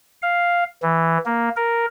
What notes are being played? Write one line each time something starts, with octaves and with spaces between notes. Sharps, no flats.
F5
E3
A#3
A#4